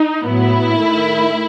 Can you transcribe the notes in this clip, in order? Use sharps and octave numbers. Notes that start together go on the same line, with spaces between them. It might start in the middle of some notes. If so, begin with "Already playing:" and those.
Already playing: D#4
A2 F#3 B3 E4
D#3 A3